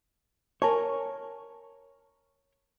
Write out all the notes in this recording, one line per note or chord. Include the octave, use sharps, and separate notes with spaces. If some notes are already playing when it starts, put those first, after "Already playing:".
A#4 C#5 G#5 A5 C#6